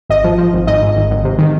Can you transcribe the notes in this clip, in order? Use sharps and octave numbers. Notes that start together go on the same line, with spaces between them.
G#1 D#5
F3
F3
G#1
G#2 D#5
G#2
G#1
G#1
C3
D#3